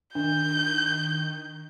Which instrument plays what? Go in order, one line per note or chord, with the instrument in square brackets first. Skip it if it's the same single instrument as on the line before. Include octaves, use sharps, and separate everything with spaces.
[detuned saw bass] D#3 [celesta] D4 [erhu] G6